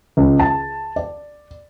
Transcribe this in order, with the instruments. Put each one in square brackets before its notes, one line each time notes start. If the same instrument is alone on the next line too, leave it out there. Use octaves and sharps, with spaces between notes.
[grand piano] C#2
A5
D5